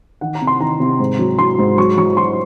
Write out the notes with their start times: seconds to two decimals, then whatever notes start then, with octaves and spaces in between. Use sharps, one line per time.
0.21 D#3 F#5
0.35 A#5
0.41 C3
0.47 C6
0.61 D#3 A#5
0.80 C3
1.00 G#2
1.19 F#3
1.39 F#3 C6
1.59 G#2
1.77 F#3 C#6
1.97 F#3 C#6
2.17 F#3 C6